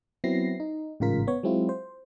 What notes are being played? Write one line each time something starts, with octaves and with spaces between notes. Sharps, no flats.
F#3 B3 C4 E4 A#6 C7
D#4
A1 G#2 C#3 F4 A#4 B6
B3 C#5
F#3 G#3 C4 E4 F4
C5